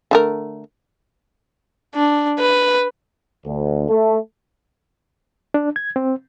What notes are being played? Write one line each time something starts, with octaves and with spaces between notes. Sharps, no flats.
D3 A3 A#4
D4
B4
D2
A3
D4
G#6
C4